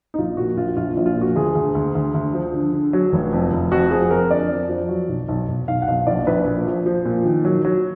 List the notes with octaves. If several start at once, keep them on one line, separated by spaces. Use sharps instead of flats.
D#4
A#1 F4
A#2 F#4
A#1 F4
A#1 F4
A#1
F4
A#2
F#4
D2 G#4
D2
D2
D2
D2
F3
D3
D3
F#3
F1
F2
F1
F2 F#4
F3 G#4
F2 A#4
D3 D5
F2
F3
F#3
B1
B1
B1
B1 F5
F#5
B1 F5
A#1 D5
A#1 B4
A#2
F3
F3
A#2
D#3
F#3
F#3